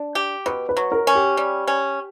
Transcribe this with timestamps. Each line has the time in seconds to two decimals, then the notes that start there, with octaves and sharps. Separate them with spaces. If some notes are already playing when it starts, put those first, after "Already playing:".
Already playing: D4
0.15 G4
0.46 B2 B4
0.69 B4
0.77 F#3
0.92 A#4
1.07 C#4
1.15 G4
1.37 G3
1.67 C#4